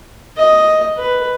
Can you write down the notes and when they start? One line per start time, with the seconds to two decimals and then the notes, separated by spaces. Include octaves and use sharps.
0.37 D#5
0.98 B4